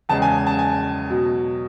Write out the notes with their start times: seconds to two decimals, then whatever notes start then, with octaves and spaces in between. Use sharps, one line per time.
0.09 E2 C#3 G#3 A5
0.22 G#5
0.47 A5
0.59 G#5
1.10 B2 F#3